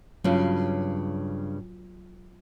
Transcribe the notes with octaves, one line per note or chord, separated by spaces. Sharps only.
G2 C#3 F#3 F4